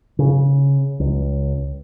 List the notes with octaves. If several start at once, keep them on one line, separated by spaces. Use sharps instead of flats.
C#3
C#2